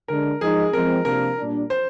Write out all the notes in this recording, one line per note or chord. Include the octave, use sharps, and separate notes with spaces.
D3 G#3 D4 A#4
F3 G#3 D#4 G#4
F3 G#3 C4 A#4
C3 F3 A#3 D4 A#4
A#2 G3 D4
C5